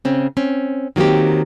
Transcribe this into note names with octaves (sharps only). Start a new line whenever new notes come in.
C#3 C4 C#4
C4 C#4
D#3 F#3 A#3 C4 G4